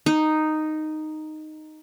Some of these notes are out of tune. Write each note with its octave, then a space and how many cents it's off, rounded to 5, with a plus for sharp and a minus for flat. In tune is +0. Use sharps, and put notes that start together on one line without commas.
D#4 -5